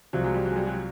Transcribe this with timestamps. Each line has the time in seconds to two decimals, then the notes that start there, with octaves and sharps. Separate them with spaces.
0.13 C2 C3 F3 F#3
0.24 F#3 G#3
0.34 G3
0.45 F#3
0.52 G#3
0.56 G3
0.67 F#3 G#3